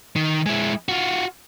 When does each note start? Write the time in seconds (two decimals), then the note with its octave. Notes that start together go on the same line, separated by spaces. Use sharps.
0.16 D#3
0.46 G#3 E4
0.89 F4 F#4